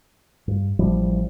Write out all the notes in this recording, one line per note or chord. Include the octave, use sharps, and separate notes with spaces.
G2
A1 E3 F3 G3